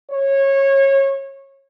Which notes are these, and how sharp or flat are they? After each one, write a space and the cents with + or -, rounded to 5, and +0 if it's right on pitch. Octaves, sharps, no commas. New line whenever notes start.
C#5 -20